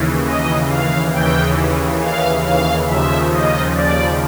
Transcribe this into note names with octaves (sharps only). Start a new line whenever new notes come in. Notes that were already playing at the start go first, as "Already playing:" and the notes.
Already playing: D#2 C#3 E3
D#5
F5
D#2 C#3 E3 G5
F5
F5
D#2 C#3 F3 E5
D#5
D5